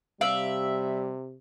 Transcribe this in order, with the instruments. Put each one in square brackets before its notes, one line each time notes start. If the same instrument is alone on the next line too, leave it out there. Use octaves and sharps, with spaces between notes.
[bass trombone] C3 [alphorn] G3 [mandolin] D5 E5 [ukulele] F5